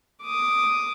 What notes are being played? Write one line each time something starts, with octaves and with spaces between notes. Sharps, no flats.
D6 D#6